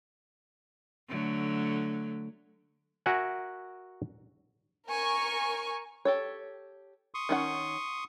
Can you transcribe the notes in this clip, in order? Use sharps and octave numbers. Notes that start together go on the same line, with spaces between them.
D3 F#3 A3
F#4 A#4 E5 F#5 G#5
A#4 G#5 C#6
G4 A4 C#5
C6 C#6 D#6
D#3 C#4 F#5